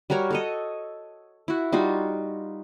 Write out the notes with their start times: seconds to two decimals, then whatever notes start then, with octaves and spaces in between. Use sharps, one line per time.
0.10 G3 F#4 A#4 C#5
0.31 A4 C#5 D#5
1.48 E4 F#4
1.72 G3 D#4 F4 F#4